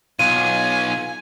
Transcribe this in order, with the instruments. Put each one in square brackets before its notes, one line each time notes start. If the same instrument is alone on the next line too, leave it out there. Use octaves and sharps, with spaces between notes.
[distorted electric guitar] B1 [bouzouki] F4 [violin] G#5 [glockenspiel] D#7